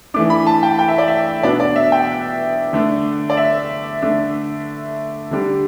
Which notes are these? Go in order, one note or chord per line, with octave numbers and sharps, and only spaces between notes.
E3 A3 D4 D6
B5
A5
G5
G5
E5
D5
E5
B2 B3 D4 D5
D5
E5
G5
D3 A3 D4
D5
E5
D3 A3 D4
D3 G3 D4